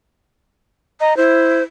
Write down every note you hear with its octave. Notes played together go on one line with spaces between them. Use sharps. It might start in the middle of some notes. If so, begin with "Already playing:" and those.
D#5 A#5
E4 C5